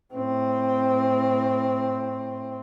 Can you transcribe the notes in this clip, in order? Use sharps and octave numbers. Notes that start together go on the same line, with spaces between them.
A2 C4